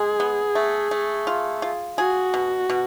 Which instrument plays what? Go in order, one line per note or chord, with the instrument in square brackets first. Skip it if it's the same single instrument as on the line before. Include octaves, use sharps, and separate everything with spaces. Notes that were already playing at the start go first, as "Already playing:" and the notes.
Already playing: [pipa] G#3 [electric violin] G#4
[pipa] B3
A3
A3
F4
F4
[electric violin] F#4 [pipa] G#4
[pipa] B2
B2